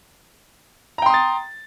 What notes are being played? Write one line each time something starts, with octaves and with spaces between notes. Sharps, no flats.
G5 A#5 C6 D#6 A6